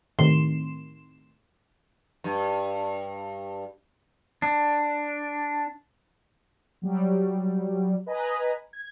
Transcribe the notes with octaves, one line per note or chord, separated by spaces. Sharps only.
A2 C3 D#3 C6 E7
G2
D4
F#3 G3
B4 D#5 G#5 A#5 B5
G#6